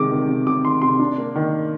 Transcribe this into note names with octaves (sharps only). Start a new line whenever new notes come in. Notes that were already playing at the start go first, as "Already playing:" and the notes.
Already playing: C3 D#3 G#3 D6
D#3
C3
C3 D6
D#3 C6
C3 C6
D4
A#3
D#3